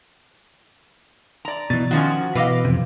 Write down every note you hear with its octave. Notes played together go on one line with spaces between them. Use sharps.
D5 A#5
B2 E3 A6
D#3 F3 C#4 F#4
B2 E3 B4 D#5 F5 D6
F2 C3